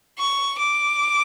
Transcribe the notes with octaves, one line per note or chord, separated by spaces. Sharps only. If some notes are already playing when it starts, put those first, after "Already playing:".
C#6
D6